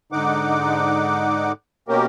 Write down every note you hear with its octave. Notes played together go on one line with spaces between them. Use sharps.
G#2 D3 D#4 F#5 D6
B2 A#3 C#4 G4 A#4